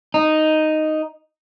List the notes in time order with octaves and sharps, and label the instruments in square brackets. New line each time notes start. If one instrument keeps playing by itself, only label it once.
[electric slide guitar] D#4